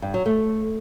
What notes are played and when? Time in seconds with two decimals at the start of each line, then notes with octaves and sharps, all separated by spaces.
0.02 G2
0.14 F#3
0.26 A3